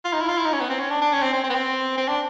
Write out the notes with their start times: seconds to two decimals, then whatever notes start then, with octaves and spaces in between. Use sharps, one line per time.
0.05 F4
0.13 D#4
0.21 E4
0.29 F4
0.38 E4
0.45 D#4
0.53 C#4
0.60 B3
0.70 C4
0.80 C#4
0.90 D4
1.02 D4
1.12 C#4
1.22 C4
1.33 C4
1.44 C4
1.50 B3
1.55 C4
1.98 C4
2.08 D4